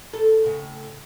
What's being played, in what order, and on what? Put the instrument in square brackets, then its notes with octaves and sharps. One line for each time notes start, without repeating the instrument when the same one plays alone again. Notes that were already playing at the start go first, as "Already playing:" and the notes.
[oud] A4
A2 C#3